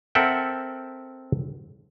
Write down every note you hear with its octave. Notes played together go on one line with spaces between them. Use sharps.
C4 A4 A#4 E5 F#5 G5